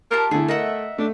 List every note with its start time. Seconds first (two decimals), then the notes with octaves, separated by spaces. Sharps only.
0.11 F4 G4 A#4 A5
0.31 D3 A3 E4 G#4
0.48 A#4 D#5 E5 F#5
0.98 A3 D4